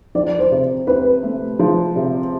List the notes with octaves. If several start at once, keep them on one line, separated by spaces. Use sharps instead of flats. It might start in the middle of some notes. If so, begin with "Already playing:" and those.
F3 D5
C5
C3
C4 B4
A3
F3
C3